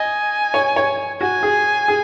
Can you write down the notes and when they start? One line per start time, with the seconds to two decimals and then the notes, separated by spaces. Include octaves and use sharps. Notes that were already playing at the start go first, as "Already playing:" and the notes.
Already playing: D#5 G#5
0.54 C#5
0.76 C#5
1.21 F#4 G#5
1.43 G#4
1.88 G#4